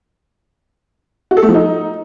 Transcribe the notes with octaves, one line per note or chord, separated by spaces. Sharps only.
F#4
A4
A3
F3
D#4